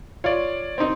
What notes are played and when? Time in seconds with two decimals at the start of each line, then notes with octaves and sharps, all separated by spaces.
0.24 F4 C#5 D5
0.78 C4 D#4